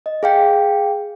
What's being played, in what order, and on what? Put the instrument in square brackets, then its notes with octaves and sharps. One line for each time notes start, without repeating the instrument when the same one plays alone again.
[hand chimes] D#5
G#4 F5 G5